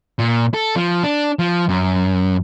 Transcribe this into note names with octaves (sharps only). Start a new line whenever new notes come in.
A#2
A4
F3
D4
F3
F#2